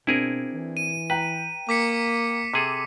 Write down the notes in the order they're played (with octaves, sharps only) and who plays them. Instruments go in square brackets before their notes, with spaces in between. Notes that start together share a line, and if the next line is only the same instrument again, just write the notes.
[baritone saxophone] B2 [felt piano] C4 D4 [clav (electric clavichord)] E4 G#4 A#4
[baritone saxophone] E3
[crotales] D#7
[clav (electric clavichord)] B4 [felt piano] G5 A#5
[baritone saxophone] A#3 [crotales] D6 B6 C#7
[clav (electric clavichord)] C3 G#4 A4